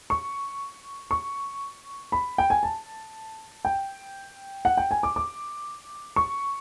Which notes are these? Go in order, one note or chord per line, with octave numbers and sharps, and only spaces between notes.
C#6
C#6
B5
G5
G#5
A5
G5
F#5
G5
G#5
D6
D6
C#6